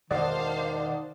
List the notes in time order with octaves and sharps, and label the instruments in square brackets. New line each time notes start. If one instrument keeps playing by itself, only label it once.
[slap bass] E1 [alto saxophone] D#3 [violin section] C5 F5 A5 [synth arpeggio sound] D5 D#5 F#5